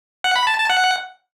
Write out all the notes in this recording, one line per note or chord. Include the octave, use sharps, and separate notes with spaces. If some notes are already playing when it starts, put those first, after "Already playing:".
F#5
B5
A5
A5
F#5